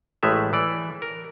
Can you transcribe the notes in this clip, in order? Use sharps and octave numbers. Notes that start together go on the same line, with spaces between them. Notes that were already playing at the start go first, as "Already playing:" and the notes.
A1 A2 G#3 A3 E5
E3 D5
A#4